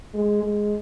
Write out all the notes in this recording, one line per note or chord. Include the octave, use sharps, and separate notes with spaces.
G#3
G#3